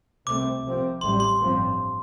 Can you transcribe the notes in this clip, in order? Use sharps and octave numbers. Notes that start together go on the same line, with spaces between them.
C2 C3 A3 C4 D6
C2 C3 F3 C4
A1 A2 G3 C6
C6
A1 G2 F3 C4